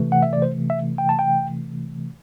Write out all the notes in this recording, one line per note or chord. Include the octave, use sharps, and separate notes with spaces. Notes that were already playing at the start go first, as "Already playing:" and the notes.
Already playing: C3 E3 A3
F#5
E5
D5
C5
E5
G5
A5
G5